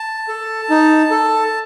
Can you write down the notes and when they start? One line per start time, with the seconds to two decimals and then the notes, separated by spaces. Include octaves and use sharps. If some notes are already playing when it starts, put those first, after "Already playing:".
Already playing: A5
0.28 A4
0.70 D#4
1.11 A4